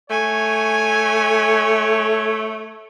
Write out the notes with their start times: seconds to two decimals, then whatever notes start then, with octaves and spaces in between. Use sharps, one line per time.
0.10 A3 C#5 G#5